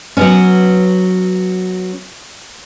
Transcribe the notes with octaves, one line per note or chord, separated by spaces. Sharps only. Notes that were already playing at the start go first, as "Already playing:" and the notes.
F#3 B3 C#4